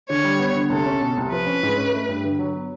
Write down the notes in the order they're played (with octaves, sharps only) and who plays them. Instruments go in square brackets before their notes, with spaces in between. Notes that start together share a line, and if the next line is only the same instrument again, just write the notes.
[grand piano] D3 [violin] C#5
[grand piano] G3
B3
D3
[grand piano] C2 [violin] A4
[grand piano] C#4
B2
C2
[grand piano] F3 [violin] B4
[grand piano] C#4
G#2
C#4
A3
G2
D3
F#3
B3